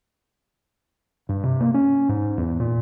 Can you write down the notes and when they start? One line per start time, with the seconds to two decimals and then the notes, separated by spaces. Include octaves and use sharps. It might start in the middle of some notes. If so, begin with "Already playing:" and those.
1.29 G2
1.43 C3
1.61 A#3
1.74 C#4
2.09 G#2
2.37 E2
2.60 A#2